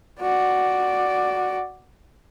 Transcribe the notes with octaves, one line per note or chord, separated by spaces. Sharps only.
F#4 D5